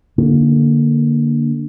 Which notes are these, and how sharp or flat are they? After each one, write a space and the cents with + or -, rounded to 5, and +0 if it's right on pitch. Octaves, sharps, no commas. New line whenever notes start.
D3 +0 A#3 +0